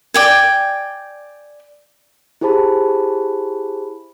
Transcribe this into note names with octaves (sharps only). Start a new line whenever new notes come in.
D5 G5 G#5
E4 G4 G#4 C5 A5 B5